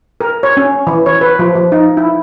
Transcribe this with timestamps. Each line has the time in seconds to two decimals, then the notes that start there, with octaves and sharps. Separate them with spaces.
0.21 A#4
0.43 C#5
0.57 C#4
0.87 E3
1.06 C#5
1.21 B4
1.39 F3
1.55 F3
1.72 D#4
1.97 E4